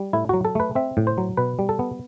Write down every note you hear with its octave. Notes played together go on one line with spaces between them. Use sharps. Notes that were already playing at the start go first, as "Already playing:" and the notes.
Already playing: G3
A2 E4
F#3 F#4
A4
A3 B4
C4 E5
A2
C5
F#3
B2 B4
G3
A4
B3